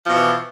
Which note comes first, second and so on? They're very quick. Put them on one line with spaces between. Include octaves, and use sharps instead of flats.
F3 B2 E3